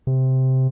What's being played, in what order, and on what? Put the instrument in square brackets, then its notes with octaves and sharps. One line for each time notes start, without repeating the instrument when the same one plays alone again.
[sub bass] C3